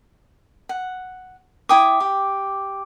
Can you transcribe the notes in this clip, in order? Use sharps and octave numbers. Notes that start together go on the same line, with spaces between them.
F#5
E4 G5 D6 D#6
G4